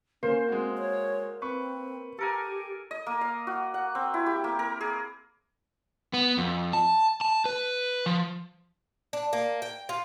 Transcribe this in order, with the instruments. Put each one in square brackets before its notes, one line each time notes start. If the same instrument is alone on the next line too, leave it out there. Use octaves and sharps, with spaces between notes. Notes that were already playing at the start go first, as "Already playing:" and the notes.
[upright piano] A#3 [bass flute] C#4 [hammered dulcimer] C5
[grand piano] G#3 F#4 [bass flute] C4
[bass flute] C#5
[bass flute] C4 [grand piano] B4 C#6
[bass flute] G4 [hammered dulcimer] A4 A#4 G#5
[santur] D#5
A#3
F5
F#4
F#5
C4
E4
G4
A#3
A#4
G#4
[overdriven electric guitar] B3
F2
A5
A5
B4
F3
[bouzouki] D4
A#3
G5
F4